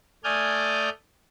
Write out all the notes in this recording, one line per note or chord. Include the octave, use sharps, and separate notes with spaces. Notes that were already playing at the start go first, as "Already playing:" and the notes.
A3 D5 G#5 D#6 F6 G6